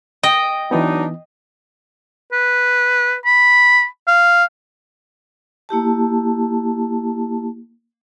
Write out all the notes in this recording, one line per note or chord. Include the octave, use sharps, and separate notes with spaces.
D#5 G5
E3 F#3 B3 D4 D#4
B4
B5
F5
A#3 E4 G4 A5